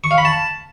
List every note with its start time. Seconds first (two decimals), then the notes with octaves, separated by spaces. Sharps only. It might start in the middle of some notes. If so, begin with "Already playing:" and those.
0.04 C#6
0.11 F5
0.18 B5
0.25 A5